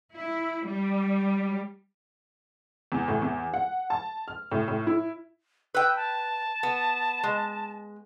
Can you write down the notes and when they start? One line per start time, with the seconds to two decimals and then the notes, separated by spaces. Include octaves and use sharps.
0.15 E4
0.65 G3
2.92 E2
3.08 A2
3.22 E2
3.54 F#5
3.90 A5
4.28 F6
4.51 A2
4.68 A2
4.87 E4
5.74 B4 G5 E6
5.96 A5
6.63 B3
7.23 G#3